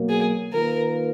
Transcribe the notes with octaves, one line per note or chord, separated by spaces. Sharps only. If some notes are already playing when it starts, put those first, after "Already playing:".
Already playing: B2 F#3 A#3
G#4
D#3 A#3 F4 A#4 B4